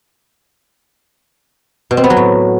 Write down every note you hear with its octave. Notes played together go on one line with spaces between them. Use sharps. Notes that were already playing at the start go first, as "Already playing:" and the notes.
B2
C4
B3
F#3
A2